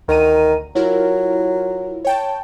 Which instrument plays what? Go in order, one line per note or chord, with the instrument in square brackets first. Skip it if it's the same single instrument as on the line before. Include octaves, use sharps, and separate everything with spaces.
[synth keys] D2 A#5 D#7 [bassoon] D#3
[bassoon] F#3 [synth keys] E4 F4 A#4
[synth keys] C#5 G5 A5